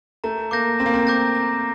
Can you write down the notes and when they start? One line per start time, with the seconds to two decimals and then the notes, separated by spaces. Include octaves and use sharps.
0.24 A3 A#5
0.51 A#3 D6 G6 A#6
0.79 C4 A#5
0.86 A#3
0.94 C4
1.07 D6 G6 A#6
1.35 A#5